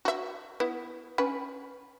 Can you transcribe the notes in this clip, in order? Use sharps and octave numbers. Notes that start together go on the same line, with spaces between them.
F#4 E5
B3 E4
C#4 B4